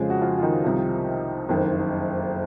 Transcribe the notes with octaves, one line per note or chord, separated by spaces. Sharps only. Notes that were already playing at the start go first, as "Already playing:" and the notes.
Already playing: F2 C#3 F3 G#3 G#4
F#4
F3 F4
F4
D#3 D#4
C2 C3 F3
F#1 F2 D#3